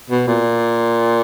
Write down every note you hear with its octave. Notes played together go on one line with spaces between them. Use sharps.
B2
A#2